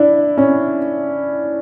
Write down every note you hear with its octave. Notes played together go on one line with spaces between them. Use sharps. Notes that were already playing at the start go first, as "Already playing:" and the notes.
Already playing: D4 E4
C#4